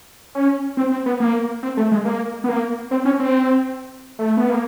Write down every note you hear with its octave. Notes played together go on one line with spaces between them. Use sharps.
C#4
C4
C4
B3
A#3
C4
A3
G#3
A#3
B3
A#3
C4
C#4
C4
A3
B3
A#3